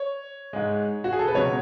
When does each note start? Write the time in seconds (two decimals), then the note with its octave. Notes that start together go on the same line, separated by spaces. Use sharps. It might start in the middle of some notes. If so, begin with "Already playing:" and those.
Already playing: C#5
0.53 G#2 G#3
1.04 F#4
1.13 G#4
1.19 A4
1.28 B4
1.34 C#2 B2 F#3 C#5